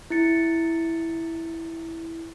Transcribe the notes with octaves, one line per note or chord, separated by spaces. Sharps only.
E4 A6 C#7